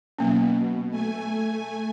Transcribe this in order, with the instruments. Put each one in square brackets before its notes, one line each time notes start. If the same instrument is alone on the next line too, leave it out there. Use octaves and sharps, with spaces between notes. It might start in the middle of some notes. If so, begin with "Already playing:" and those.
[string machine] B2 [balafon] F#3 A#3 C#4
[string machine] A3 G#5